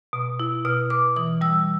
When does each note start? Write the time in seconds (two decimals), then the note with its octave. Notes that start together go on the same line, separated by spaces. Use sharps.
0.13 B2
0.40 E4
0.65 B2 F6
0.90 B2 D6
1.16 E3 D#6
1.41 G3 E6